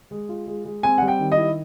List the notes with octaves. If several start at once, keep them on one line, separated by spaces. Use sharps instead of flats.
G#3
F4
G#3
G#3
C4 G#5
G3 F#5
G5
D#3
D#5
E4